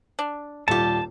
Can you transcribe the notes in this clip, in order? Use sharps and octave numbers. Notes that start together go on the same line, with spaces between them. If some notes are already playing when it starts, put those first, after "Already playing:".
D4
D#1 G3 A3 F4 G4 A5